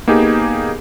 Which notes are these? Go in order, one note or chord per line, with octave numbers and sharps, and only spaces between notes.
A#3 B3 D#4 G4 G#4